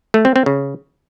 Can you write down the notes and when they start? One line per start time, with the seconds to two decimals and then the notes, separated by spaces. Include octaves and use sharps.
0.14 A3
0.25 C4
0.36 C4
0.46 C#3